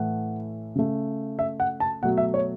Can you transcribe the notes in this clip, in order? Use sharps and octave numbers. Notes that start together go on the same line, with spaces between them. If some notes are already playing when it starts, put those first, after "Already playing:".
Already playing: A2 E3 A3 F#5
C#3 A3
E5
F#5
A5
B2 F#3 A3 F#5
E5
C#5